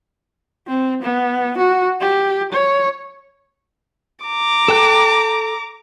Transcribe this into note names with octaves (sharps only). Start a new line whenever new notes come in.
C4
B3
F#4
G4
C#5
A#5 D6
A4 G5 F#6